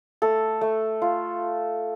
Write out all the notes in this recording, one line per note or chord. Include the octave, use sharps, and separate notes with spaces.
A3 A4
A3
F4